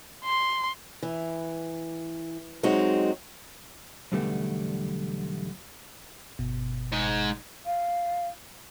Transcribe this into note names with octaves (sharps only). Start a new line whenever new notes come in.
C6
E3
F#3 G#3 C4 D#4 F#4
B1 E2 D3 G3 A3 B3
G1 B2
G#2 G#3
F5